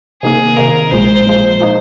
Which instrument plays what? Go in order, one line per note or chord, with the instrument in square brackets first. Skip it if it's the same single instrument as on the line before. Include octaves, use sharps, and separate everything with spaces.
[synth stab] C3 D#3 A#3 [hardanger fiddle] G#4
[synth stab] C3 D#3 A#3 [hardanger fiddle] A#4
[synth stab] A#1 A#2 F3 G#3 [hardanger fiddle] C5
[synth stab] A#1 A#2 F3 G#3
F3 A#3 D#4